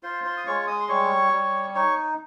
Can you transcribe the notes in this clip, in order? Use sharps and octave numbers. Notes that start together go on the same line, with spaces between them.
F4 C5 C6
C5 C6
D#6
G#3 C#5 C#6
D#5 D#6
C6
G3 C#5 C#6
G3
D#4 C#5 C#6